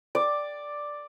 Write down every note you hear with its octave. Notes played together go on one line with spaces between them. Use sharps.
D5